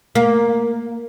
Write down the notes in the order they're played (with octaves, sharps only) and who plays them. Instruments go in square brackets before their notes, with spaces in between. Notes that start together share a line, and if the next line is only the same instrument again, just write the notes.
[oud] A#3